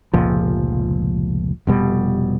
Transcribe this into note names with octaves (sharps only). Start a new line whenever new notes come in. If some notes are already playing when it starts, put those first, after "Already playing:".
F1 C#2 A#2 F3
F1 B2 G3